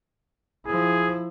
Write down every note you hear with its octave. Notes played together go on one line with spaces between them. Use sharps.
F3 E4 G#4